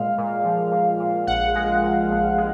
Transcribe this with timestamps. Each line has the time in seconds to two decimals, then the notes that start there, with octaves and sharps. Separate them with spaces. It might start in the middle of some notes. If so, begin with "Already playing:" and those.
Already playing: A#2 G#3 F5
0.18 A#2
0.45 F3
0.72 A#2
1.00 A#2
1.27 A#1 F#5
1.55 G#3
1.83 A#2
2.10 A#1
2.38 G#3